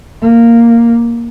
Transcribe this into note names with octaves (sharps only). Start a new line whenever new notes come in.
A#3